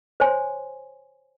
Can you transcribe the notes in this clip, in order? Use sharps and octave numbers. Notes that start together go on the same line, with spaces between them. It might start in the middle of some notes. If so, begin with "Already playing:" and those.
C5 C#5 G#5 C6